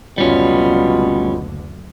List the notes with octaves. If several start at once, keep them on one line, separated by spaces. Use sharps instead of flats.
F#1 D2 B2 D3 G3 C#4 F4